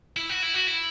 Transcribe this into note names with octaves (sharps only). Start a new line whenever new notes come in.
E4
F#4
E4
F#4
E4